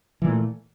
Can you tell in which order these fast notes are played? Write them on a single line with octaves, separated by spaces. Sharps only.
E3 A#2 A3